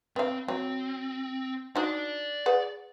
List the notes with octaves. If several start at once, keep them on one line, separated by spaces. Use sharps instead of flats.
B3 C4 F5
F#3 C4
D#4 F#4 D5 A5
G#4 B4 F#5